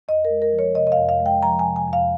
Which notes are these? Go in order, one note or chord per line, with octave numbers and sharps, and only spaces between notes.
F2 D#5
A#4
G#3
A#4
F3
C#5
C3 D#5
D#5
F5
F2
F5
G#3
G5
F3 A#5
G#5
C3
G#5
F2
F5